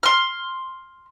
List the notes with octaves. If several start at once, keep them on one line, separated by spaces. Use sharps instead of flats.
C6 F6